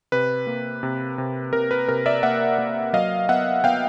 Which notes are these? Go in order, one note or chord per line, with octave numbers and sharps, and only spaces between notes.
C3 B4
A#3
C3
C3
C3 A#4
B4
C3 A#4
D5 E5
A#3 E5 F#5
A#3
F#3 D#5 F5
B3 E5 F#5
B3 F5 G5